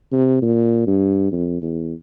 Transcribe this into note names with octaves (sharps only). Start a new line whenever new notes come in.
C3
A#2
G2
F2
E2